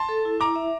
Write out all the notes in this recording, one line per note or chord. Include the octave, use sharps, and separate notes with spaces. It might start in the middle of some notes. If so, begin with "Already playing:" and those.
Already playing: A5 C6
A4
E4
E4 A#5 D6
E5